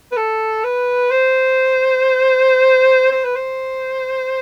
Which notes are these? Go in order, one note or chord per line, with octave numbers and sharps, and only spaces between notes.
B4
A4
B4
C5
C5
B4
C5